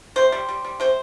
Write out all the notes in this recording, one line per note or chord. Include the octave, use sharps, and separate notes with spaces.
C3 C5
G3
G3
G3
C3 C5